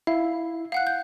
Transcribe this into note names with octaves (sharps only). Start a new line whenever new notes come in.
E4 F5
F5 F#5 F#6
G6